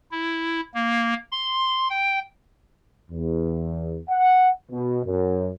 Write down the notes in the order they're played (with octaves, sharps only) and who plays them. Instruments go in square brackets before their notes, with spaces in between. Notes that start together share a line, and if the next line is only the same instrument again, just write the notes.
[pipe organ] E4
A#3
C6
G5
[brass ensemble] E2
F#5
B2
F#2